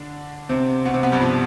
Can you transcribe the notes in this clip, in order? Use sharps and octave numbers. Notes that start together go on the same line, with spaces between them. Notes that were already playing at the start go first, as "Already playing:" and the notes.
Already playing: D3 D4
C3 C4
B2 B3
C3 C4
B2 B3
G2 G3
F3